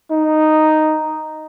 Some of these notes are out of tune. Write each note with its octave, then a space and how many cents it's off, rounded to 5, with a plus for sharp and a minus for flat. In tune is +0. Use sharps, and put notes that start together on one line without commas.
D#4 -5